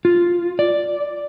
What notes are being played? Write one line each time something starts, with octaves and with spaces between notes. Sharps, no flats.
F4
D5